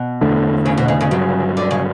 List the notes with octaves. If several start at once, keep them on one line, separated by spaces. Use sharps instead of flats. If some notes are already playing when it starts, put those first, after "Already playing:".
Already playing: B2
E2 D3 A3 D4
C#3
B2
C#3
C#3
G1 G2 C#3 F#3
D3
C#3